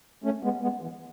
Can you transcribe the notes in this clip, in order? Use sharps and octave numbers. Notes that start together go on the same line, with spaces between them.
A3 C#4
G#3 B3
G#3 B3
E3